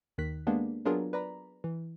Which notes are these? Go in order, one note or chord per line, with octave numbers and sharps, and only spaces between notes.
D#2 D#3 F#6 B6
G#3 A#3 B3 D4 G4
F#3 B3 D4 F4 G#4 A#4
B4 D5 A#5 B5
E3